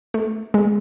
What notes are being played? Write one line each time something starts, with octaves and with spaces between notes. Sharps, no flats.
A3
G#3